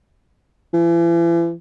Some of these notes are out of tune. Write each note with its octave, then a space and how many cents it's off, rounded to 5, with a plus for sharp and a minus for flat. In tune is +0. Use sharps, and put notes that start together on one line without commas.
E3 +40